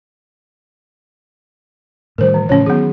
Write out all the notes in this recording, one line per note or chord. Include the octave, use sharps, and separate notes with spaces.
A2 D#3 G3 A#4 C5
E3
A2 C#3 F3 C#4 C#5
D#3 F#3 B3 G#4